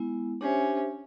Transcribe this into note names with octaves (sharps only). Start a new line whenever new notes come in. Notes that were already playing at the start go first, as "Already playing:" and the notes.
Already playing: G#3 B3 E4
C#4 D4 G4 C5 E5